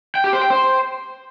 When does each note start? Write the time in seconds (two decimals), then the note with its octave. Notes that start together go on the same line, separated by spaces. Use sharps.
0.15 G5
0.24 G4
0.33 C5
0.42 G5
0.50 C5